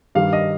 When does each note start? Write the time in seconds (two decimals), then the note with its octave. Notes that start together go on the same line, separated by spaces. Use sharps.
0.15 G2 D#3 G3 F5
0.33 D#5